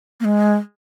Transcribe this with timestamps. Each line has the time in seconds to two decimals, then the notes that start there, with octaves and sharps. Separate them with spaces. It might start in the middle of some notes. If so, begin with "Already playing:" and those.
0.20 A#3
0.25 G#3